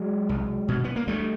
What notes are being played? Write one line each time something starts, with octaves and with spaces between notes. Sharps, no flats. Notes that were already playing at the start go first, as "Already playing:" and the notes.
Already playing: F#3 G#3
C2
B2
B3
A#3
D2 G3 A3